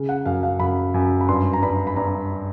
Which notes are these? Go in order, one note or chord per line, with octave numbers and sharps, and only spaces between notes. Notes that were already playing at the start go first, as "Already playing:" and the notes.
Already playing: C#3
F#5
F#2 F5
F5
F#2 B5
F#2
B5
G2 C6
A#5
G2 B5
B5
G2 A#5